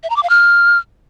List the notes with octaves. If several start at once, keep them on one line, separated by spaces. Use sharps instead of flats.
E5
A#5
D6
F5
F6